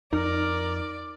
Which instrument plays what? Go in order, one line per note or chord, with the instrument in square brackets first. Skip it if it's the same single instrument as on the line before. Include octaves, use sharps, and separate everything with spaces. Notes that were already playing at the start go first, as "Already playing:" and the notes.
[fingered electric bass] F2 [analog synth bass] D#4 [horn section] A#4 [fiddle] D5